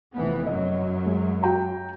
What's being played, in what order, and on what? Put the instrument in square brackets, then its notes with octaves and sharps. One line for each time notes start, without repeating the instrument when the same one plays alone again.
[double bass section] F1 E3 B3
[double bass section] F#2 F#3 [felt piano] D#5
[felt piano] G#3
F#4 G5 A#5